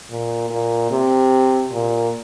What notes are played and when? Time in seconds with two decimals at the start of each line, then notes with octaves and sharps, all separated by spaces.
0.10 A#2
0.50 A#2
0.91 C3
1.72 A#2